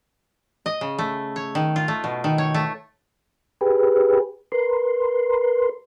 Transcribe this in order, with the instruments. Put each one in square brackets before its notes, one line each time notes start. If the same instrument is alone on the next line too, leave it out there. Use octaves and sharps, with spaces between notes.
[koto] D#5
C#3
A3
C#5
D#3
F4
A3
B2
D#3
C#5
A3
[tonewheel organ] G4 G#4 B4
A#4 B4 C6